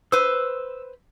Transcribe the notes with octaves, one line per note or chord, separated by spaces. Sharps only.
B4 C5 E6